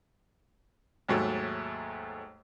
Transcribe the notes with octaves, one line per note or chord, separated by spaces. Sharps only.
D#2 G#2 F#3 A3